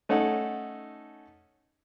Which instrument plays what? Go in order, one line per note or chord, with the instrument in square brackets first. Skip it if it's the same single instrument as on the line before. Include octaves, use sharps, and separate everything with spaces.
[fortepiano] A3 C#4 D#4 A4 F#5